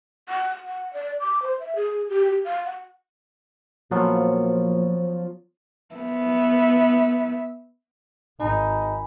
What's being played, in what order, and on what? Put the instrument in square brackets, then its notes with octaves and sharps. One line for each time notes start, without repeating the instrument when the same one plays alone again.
[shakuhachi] F#5
F#5
D5
D6
C5
E5
G#4
G4
G4
F5
F#5
[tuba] A#2 [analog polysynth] F3 [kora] F#3 B3 C#4
[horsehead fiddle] B3 E5
[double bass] G#1 [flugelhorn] D#4 [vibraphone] G#5 B5